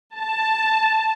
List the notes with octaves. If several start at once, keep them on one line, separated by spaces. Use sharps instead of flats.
A5